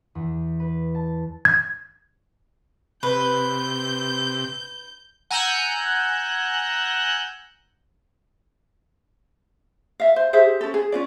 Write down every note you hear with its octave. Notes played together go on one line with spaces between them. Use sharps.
E2
B4
A5
G#6
C3 B4 G6
F#5 G#5 A#5 E6 F#6 G6
E5 F5
C5
G4 G#4 C5 E5
C#4 A4
G#4
C#4 F4 D5